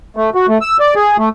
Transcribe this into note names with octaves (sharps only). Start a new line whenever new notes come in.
A3
F#4
A3
E6
D5
G#4
A3